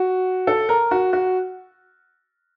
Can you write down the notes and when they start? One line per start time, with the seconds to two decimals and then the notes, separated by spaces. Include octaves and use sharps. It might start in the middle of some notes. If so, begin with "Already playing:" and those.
Already playing: F#4
0.47 A4
0.69 A#4
0.91 F#4
1.13 F#4